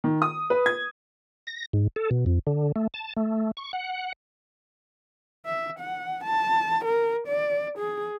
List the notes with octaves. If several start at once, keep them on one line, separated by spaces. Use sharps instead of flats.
D#3
D#6
B4
G#6
A#6
G#2
A4
B2
F2
D3
A3
A5
A3
C#6
F#5
E5
F#5
A5
A#4
D5
G#4